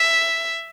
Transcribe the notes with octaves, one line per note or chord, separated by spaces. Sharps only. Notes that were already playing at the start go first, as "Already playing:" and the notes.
Already playing: E5